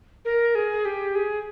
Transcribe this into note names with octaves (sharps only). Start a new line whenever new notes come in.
A#4
G#4
G4
G#4